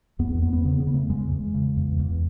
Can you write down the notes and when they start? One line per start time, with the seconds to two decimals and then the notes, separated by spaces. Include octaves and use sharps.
0.19 E2 B3
0.31 B3
0.41 E2 B3
0.53 B3
0.64 C#3 B3
0.80 B3
0.87 C#3
0.94 A3
1.09 E2 G#3
1.31 E2
1.54 C#3
1.77 E2
1.99 E2